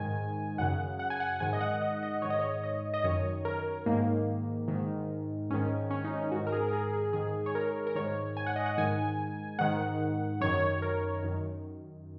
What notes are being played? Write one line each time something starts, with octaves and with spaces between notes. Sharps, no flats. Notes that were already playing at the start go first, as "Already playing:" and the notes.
Already playing: G#2 D#3 G#5
F#2 C#3 F#5
F#5
G#5
F#5
F#5
G#2 D#3 G#5
D#5
F#5
D#5
D#5
G#2 D#3 C#5
D#5
C#5
D#5
D#5
F#2 D#3 C#5
A#4
G#2 D#3 A#3
G#2 D#3
G#2 D#3 C#4
C#4
D#4
C#4
G#2 D#3 F#4
A#4
G#4
A#4
G#4
G#4
G#2 D#3 G#4
C#5
A#4
A#4
G#2 D#3 C#5
G#5
F#5
D#5
F#5
G#2 D#3 G#5
G#2 D#3 F#5
F#2 D#3 C#5
A#4
F#2 D#3